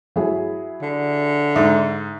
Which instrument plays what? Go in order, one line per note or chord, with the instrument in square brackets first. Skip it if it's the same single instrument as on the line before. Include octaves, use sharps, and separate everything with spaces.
[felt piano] F#3 E4 G#4
[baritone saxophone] D3
[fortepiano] G#2 [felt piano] E5